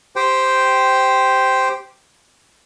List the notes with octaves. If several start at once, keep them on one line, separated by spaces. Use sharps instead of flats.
G4 C5 G5